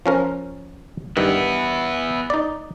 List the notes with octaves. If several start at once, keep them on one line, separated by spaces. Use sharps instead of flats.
F3 C#4 A#4
G2 D#3 B3 E4
D#4 D5